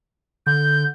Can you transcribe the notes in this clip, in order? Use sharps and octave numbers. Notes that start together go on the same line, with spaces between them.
D3 G6